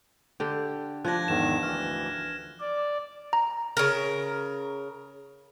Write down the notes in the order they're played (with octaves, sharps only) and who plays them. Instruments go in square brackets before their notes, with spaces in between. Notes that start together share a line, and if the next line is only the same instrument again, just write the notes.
[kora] D3 G4
[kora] F3 D4 [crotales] F#6 G#6 A#6
[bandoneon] E2 G#2 D#3 [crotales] E7
[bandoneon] D2 E3 [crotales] F6
[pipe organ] D5
[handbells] A#5
[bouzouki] C#3 A#4